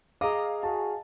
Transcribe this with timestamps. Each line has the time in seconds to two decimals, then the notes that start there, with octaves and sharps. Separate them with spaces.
0.21 G#4 D#5 F5 A#5 D6
0.63 F#4 G#4 A5